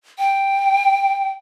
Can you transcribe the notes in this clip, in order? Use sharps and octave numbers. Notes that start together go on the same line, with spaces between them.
G5